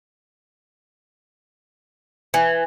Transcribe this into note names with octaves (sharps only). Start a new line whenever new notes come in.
E3